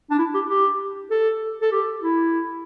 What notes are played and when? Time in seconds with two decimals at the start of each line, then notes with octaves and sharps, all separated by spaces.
0.10 D4
0.19 E4
0.34 G4
0.49 G4
1.11 A4
1.62 A4
1.72 G4
2.03 E4